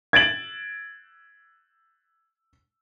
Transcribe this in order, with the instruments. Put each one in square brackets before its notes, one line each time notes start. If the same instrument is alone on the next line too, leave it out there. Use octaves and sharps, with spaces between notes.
[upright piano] G#6 A6 D7 F#7